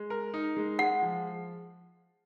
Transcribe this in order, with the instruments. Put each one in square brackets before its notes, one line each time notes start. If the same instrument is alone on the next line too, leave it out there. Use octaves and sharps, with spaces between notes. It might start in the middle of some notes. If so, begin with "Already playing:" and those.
Already playing: [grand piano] G#3
A#4
D#4
G#3
[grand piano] G#3 [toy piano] F#5
[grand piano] F3